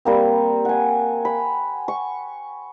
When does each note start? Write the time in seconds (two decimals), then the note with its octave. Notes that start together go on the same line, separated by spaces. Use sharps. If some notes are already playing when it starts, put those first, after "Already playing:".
0.05 G3 A#3 C4
0.65 F#5 G#5
1.25 B5
1.88 C#6